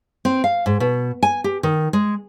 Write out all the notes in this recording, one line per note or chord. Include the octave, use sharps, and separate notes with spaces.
C4
F5
G#2
B2
G#5
G4
D#3
G#3